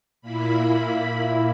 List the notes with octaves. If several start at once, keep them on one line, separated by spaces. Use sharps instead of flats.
A#2 A#3 E4 B5
B5